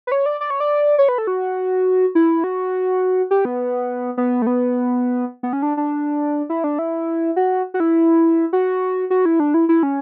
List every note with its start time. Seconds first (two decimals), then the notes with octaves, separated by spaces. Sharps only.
0.07 B4
0.12 C#5
0.26 D5
0.41 D5
0.50 C#5
0.60 D5
0.98 C#5
1.09 B4
1.18 A4
1.27 F#4
2.15 E4
2.44 F#4
3.31 G4
3.45 B3
4.17 B3
4.42 A3
4.47 B3
5.43 B3
5.53 C#4
5.62 D4
5.77 D4
6.50 E4
6.64 D4
6.79 E4
7.36 F#4
7.74 F#4
7.80 E4
8.53 F#4
9.10 F#4
9.25 E4
9.40 D4
9.54 E4
9.69 E4
9.83 C#4